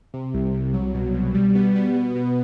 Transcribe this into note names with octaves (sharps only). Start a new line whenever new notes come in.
C3
C2
C2
F#3
B2
B2
G3
B3
B3
B2
B2